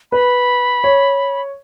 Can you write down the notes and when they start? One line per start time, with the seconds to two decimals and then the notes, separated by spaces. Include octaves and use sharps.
0.12 B4 B5
0.84 C#5